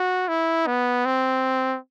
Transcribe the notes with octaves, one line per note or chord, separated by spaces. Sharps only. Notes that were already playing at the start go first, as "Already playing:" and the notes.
Already playing: F#4
E4
B3
C4